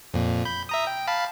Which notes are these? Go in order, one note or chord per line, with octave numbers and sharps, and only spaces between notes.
F2 A#2
B5 G6
E5 A#5 D#6
G5
F5 A5 B5